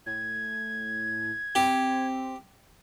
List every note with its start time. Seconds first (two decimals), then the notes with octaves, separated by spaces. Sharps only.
0.06 A2 G#6
1.55 C4 G4